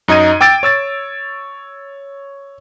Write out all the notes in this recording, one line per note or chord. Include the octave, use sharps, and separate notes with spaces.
F#2 D#4 D#5 G#6 D#7
G5 D6 E6 A6 D7
C#5 E6 A6